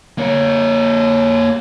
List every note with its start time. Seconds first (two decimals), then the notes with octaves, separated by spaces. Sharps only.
0.18 A#3 C#5